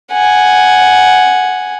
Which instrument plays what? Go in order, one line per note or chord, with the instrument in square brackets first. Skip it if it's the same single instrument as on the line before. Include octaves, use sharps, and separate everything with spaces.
[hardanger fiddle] F#5 G#5